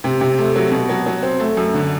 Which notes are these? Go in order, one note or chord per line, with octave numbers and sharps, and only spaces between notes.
C3
C3
A3
F#3
B2
F#3
F#3
C4
A3
F#2
D3